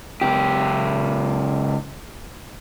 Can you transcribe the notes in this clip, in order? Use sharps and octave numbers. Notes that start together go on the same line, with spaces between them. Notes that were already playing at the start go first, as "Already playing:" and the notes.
C#2 G4